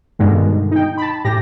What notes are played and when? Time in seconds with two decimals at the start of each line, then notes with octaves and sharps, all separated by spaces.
0.19 G2 B2 D3 D#3 G#3
0.71 D#4 G5
0.98 A5 B5
1.25 A2 G4 A#6